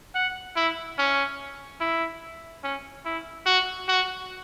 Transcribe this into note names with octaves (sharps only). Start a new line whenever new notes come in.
F#5
E4
C#4
E4
C#4
E4
F#4
F#4